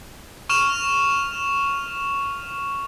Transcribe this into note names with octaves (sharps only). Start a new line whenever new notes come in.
C#6 F6 E7 F7